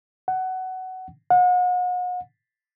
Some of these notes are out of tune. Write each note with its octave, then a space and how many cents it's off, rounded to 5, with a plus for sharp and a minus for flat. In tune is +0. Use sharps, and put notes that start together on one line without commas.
F#5 +15
F#5 -40